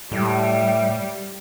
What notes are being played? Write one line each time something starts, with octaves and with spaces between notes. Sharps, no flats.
A2 G3